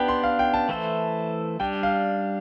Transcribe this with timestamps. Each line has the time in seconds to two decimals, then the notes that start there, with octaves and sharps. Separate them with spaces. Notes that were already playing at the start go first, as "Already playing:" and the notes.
Already playing: B3 D4 G4 B4 G5
0.08 C6
0.24 F5
0.39 G5
0.54 A5
0.69 E3 A3 E4 A4 C5
1.60 G3 D4 G4 G5
1.83 F5